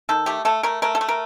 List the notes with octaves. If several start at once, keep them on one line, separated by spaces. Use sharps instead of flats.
D#3 A4
A3 G4
A3 A4
A3 A#4
A3 A#4
A4
A3
A#4